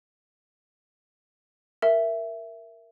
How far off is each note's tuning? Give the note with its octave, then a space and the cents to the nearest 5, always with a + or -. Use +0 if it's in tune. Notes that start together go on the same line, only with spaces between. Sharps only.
A#4 +0 E5 +10